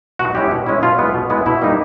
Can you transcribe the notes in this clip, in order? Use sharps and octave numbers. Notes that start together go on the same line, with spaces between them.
B2 F#4
G#3 C#4 E4 G4
B2
G#3 C#4 E4
B2 F4
G#3 B3 E4
B2
G#3 B3 E4
B2 E4
G3 A#3 D#4